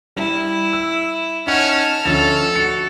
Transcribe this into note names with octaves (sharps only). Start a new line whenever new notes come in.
G3 E4
E6
C#4 D#4 F#5 A5 F6
D2 F3 C#4 A4
F#4 C#7